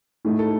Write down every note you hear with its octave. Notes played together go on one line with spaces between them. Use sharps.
A2 A3 D#4
A4